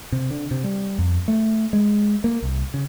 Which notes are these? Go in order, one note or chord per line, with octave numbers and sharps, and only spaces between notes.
C3
D3
C3
G3
F2
A3
G#3
A#3
C2
C#3